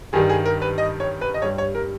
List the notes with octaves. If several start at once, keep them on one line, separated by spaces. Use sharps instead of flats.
G2 D#3 G3 G#4
G#4
A#4
B4
D#5
C#5
B4
D#5
G2 G3 C#5
C#5
A#4